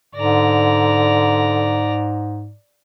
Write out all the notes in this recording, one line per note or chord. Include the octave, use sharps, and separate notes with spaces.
G#2 D3 D5 A#5